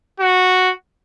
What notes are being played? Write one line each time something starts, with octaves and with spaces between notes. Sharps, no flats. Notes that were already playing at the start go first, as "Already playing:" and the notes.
F#4